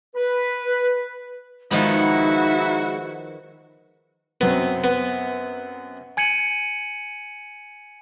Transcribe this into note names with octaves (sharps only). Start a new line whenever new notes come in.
B4
D#3 F3 G#3 B3 D#4 E4 F#4 E5
F#2 F#3 B3 C4
B3
G#5 G#6 C#7 D#7 F#7